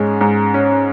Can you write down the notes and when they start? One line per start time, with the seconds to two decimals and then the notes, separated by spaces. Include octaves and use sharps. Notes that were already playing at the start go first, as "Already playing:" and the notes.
Already playing: G#2 G#3 C#4
0.21 G#2
0.54 C#4